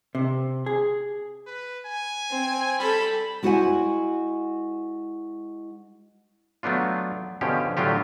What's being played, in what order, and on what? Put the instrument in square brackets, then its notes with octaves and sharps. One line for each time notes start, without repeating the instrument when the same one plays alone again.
[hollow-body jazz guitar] C3
G#4
[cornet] B4
G#5
[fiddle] C4
[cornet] G3 [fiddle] A4 B5
[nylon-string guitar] G#3 E4 F#4 C5 F#5 G#5
[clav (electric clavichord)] F#3 A3 B3 D4 F4
B2 D3 F3 C#4 G4
A2 D3 F#3 F4 G4